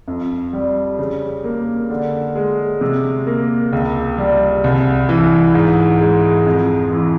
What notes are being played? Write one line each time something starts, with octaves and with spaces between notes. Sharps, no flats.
F2
G3
C#3
A#3
D3
G#3
C3
A#3
C#2
G3
C2
E3
G#2
G#3
F2
E3